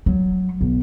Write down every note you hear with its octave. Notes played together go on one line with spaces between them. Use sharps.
F#3
B1